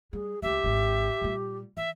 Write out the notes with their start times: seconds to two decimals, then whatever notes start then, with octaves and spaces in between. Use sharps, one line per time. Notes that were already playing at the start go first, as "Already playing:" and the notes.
0.13 G3 G#4
0.42 C#2 D3 G4 E5
0.64 G#1 D3
1.22 A#2 G3
1.77 E3 E5